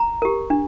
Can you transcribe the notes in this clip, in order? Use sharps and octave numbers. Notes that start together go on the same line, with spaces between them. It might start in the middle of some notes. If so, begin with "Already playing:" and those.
Already playing: A#5
G4 A#4
D4